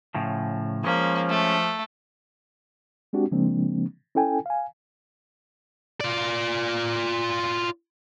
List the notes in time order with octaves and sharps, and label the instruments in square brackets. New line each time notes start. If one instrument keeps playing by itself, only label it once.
[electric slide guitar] A2 C#3 F3
[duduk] F3 [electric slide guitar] G#3 C#4 [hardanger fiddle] A#3
[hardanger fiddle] A3
[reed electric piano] G#3 C4 D4 F#4 G4
C#3 F3 G#3 A#3 C4 D4
C#4 E4 A4 G5 G#5
F5 G#5
[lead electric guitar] F4 D5